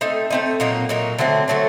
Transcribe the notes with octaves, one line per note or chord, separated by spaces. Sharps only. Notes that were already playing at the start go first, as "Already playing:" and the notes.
A3 C4 D#4
A3 C4 D#4
A#2 F#3 A#3 D#4
A#2 F#3 A#3 D#4
D3 F#3 A3 C4
D3 F#3 A3 C4